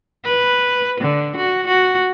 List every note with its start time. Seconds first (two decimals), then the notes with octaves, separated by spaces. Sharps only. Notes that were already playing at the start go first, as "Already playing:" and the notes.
0.25 B4
1.01 D3
1.37 F#4
1.68 F#4